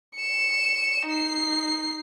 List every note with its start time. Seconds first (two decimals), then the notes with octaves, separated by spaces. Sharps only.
0.16 C#7 E7
1.08 D#4 C7